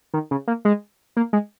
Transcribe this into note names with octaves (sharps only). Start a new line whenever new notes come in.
D#3
C#3
A#3
G#3
A#3
G#3